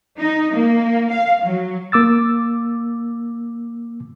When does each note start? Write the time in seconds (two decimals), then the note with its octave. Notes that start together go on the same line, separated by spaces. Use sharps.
0.19 D#4
0.54 A#3
1.11 F5
1.45 F#3
1.92 A#3 D6 E6 A6